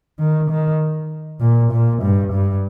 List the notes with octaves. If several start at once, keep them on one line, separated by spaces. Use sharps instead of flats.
D#3
D#3
A#2
A#2
G2
G2